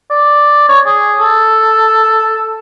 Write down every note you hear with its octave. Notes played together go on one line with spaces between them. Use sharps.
D5
C#5
G#4
A4